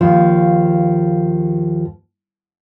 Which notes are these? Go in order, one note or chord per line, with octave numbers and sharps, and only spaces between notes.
D#2 F3